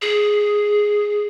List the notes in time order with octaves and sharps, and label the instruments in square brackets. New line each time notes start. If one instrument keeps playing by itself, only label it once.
[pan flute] G#4